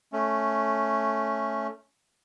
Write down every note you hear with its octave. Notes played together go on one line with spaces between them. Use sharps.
A3 C#4